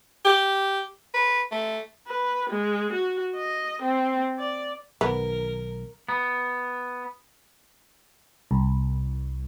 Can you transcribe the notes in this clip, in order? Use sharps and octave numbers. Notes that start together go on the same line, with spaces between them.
G4
B4
A3
B4
G#3
F#4
D#5
C4
D5
B1 D#3 B3 A#4
B3
C2